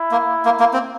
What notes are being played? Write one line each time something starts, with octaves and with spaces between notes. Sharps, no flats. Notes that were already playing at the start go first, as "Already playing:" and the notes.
Already playing: E4
A#3
A#3
A#3
C4